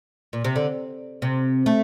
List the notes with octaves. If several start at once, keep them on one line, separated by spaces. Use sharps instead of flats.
A#2
C3
D3
C3
A3